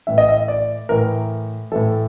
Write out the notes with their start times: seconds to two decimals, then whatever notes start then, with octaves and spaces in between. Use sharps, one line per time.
0.07 A2 E3 E5
0.18 D#5
0.29 E5
0.48 D5
0.89 A2 E3 A#4
1.72 E3 A4
1.76 A2